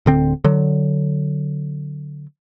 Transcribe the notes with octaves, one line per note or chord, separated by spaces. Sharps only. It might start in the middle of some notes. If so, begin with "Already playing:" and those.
D1 D3 C4
D3 F#3